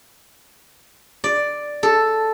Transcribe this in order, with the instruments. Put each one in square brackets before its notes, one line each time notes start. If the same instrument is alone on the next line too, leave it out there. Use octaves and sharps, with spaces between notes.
[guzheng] D5
A4